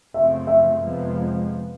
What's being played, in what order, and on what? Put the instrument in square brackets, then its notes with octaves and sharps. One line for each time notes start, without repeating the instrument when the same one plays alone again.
[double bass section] F#2 C#3 F3 A3 C4 [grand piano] E5
[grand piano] E5
[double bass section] F2 C3 F3 G#3 B3